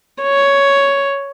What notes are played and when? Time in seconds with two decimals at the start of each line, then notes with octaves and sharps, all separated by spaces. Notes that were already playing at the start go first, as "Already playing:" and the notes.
0.23 C#5